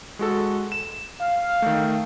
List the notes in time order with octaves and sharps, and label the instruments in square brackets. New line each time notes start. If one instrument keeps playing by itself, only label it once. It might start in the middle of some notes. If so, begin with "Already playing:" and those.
[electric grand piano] G#3 F#4 A4
E7
[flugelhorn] F5
[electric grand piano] D#3 A3